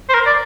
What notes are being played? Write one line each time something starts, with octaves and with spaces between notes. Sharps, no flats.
C5
A#4
D5